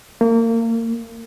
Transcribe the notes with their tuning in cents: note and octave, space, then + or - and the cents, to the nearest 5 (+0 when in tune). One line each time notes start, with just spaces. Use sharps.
A#3 -30